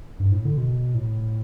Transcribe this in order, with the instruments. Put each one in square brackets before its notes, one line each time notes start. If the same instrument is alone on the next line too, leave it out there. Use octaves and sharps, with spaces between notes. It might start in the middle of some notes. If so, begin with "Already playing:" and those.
[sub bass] G2
A2
D3
B2
A2